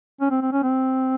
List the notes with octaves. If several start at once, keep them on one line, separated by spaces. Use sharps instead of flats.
C#4
C4
C4
C#4
C4